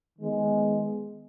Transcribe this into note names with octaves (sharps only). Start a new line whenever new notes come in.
D#3 G#3 B3